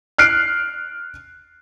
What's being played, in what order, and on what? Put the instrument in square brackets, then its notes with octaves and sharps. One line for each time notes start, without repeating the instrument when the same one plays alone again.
[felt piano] F6 F#6 C7 D7